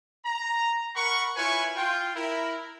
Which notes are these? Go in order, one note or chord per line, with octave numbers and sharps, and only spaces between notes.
A#5
A#4 F#5 B5 C#6
E4 F4 B4 C#5 G#5 C#6
F4 G5
E4 A#4